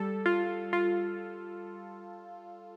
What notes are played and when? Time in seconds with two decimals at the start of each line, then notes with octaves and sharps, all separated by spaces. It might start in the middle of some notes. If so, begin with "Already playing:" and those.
Already playing: G3 A4
0.26 F4
0.73 F4